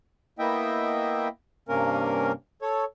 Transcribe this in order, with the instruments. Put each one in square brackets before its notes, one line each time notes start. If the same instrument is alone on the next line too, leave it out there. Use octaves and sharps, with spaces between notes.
[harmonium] A#3 B3 E4 D#5 E5 G5
G2 C3 A#3 C#4 A#4
A4 C#5